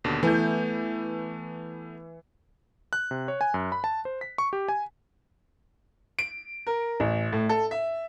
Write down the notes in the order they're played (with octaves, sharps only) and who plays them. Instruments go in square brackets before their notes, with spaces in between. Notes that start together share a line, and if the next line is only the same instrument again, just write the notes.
[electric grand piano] D#2 B2 D3
[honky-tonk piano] E3 G6 [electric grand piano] A3 B3
[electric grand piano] F#6
C3
C#5
G#5
F#2
B5
A5
C5
B6
C#6
G4
G#5
[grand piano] D7
A#4
A1
A2
A4
E5